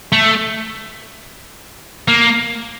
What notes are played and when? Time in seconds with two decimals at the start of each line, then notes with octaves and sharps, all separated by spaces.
0.12 A3
2.08 A#3